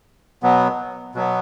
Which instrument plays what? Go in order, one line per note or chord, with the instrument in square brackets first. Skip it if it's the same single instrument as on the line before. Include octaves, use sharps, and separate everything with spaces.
[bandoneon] B2 F#3 B3
B2 F#3 B3